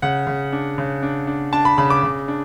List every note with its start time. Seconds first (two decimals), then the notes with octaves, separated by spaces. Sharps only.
0.02 C#3 F#5
0.27 C#3
0.52 D4
0.78 C#3
1.03 D4
1.27 D4
1.53 D4 A5
1.65 B5
1.78 C#3 B5
1.90 D6
2.03 C#3
2.28 D4